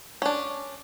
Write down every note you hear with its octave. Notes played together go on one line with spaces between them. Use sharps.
C#4 D4